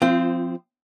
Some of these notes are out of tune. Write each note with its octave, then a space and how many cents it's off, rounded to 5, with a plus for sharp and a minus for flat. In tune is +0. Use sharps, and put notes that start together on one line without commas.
F3 +0 C4 -10 F4 -35